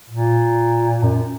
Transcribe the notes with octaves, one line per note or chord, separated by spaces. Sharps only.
A#2
F#2